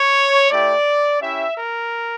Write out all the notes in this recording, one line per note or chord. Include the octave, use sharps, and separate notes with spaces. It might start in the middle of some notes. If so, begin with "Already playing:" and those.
Already playing: C#5
A3 E4 G4 D5
C#4 E4 G4 E5
A#4